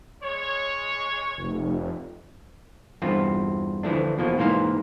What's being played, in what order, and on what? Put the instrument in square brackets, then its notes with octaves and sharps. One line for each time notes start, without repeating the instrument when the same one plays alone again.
[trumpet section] G#3 C#5
[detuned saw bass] F1
[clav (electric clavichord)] E2 G2 C4 F4
D2 E3 F3 A3 D4
E2 B2 F3 A#3
G#2 E3 A#3 C5 F5